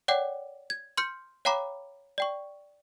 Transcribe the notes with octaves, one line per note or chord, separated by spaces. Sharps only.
C#5 D5 F#5 G5 D6
G#6
C6 F6 G6 C#7
C#5 F5 G5 A#5 B5 D6
D5 G5 C#6